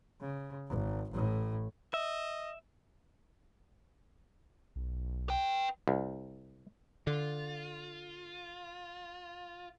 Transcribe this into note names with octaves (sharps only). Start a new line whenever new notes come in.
C#3
G#1
A1 A2
D#5 E5
B1
B4 G5
C2
D3 F4